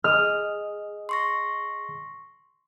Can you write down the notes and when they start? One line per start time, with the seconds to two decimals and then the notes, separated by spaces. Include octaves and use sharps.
0.04 G#4 D#5 D#6 F6
1.09 C6 C#6 A#6